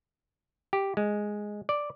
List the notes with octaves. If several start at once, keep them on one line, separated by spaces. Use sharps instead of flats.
G4
G#3
D5